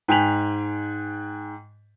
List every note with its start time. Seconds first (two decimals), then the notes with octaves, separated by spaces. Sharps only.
0.08 G#2 G5 G#5 B6 F7 F#7